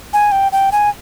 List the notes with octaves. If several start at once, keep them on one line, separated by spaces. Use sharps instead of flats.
G#5
G5
G5
G#5